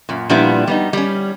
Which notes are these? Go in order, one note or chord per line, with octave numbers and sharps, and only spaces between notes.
F#2 A#2
A#2 F3 G3 B3 D4 E4
G3 B3 D#4
G3 C#4